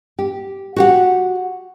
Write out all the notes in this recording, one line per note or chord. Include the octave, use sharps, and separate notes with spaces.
G4
F#4 G4 F#5